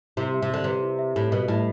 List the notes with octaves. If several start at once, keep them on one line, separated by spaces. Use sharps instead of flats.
C3 E4
E5
C3
D3 G4
C3 B4
E4
E5
A2 G4
B2 B4
A2 E4